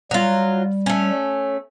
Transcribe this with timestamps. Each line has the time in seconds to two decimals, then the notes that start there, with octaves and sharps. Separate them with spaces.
0.11 F#3 G3 F4
0.86 A3 C#4